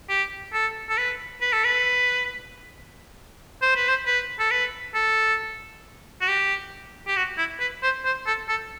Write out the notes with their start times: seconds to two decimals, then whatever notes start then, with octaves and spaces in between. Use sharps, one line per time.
0.09 G4
0.53 A4
0.89 A4
0.97 B4
1.41 B4
1.52 A4
1.64 B4
3.62 C5
3.76 B4
3.89 C5
4.06 B4
4.40 A4
4.51 B4
4.94 A4
6.21 F#4
6.28 G4
7.08 G4
7.16 F#4
7.38 E4
7.60 B4
7.83 C5
8.05 C5
8.26 A4
8.49 A4